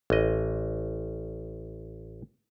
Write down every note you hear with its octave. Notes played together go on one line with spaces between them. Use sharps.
A1 D#5